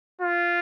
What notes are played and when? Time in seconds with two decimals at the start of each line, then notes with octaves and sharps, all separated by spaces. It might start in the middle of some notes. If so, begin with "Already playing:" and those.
0.21 F4